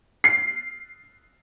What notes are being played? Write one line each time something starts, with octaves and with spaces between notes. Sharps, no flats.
C7